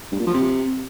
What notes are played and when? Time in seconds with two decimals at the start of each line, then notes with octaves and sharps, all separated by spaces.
0.12 G2
0.19 A#2
0.27 F3
0.34 C3